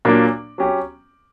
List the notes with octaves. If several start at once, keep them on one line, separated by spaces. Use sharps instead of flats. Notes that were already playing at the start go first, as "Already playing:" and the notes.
A#2 F#3 A#3 D4
F#3 C#4 G4